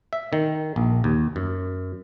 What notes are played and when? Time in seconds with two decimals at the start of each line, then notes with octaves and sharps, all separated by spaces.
0.13 E5
0.33 D#3
0.76 A#1
1.04 D#2
1.36 F#2